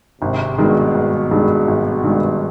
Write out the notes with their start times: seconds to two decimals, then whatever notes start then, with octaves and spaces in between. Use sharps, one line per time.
0.22 G#1 C3
0.58 G2 B2 D#3 G#3
0.95 G#1
1.31 G2 D#3 G#3
1.68 G#1
2.04 G2 D#3 G#3